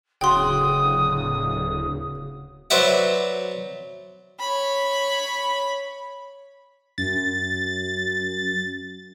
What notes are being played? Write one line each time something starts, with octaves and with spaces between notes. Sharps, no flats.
D1 C#3 F#4 G5 C6 D#6
F#3 B4 C5 D5 E5 F#5
C#5 B5
F#2 A6